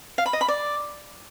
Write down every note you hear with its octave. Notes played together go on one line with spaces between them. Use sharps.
F5
B5
D#5
B5
D5